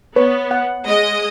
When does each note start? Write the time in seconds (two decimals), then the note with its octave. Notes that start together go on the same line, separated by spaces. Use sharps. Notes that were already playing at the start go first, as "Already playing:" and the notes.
0.16 B3 B4 C#5
0.51 F#5
0.85 G#3 D#5